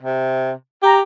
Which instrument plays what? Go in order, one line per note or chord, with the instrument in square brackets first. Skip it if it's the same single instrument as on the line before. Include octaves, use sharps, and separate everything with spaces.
[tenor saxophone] C3
[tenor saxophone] G4 [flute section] A#5